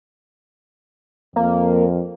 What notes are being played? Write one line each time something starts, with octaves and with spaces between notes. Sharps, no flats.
F2 A#3